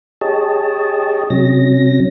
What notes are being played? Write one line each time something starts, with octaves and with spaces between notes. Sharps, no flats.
G4 G#4 C#5 D#5 A5
C3 F#3 C#4 A#6